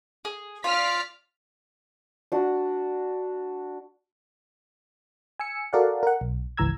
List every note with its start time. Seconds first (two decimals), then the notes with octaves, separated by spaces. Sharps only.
0.25 G#4
0.64 F4 D5 F6 B6
2.32 D4 F#4
5.40 G#5 E6 C#7
5.73 F#4 A4 A#4 D5 F5 F#5
6.03 A#4 F#5
6.21 B1
6.57 G#1 C#2 E3 A#5 E6 G#6